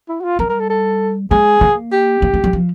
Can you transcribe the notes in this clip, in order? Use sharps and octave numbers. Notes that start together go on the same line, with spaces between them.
E4
F#4
F4
G3 A#4
A#4
A4
A4
G#3 G#4
A#3
G4
A#3
A3
G3
F3